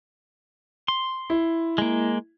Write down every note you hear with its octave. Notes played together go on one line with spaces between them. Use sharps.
C6
E4
G#3 A#3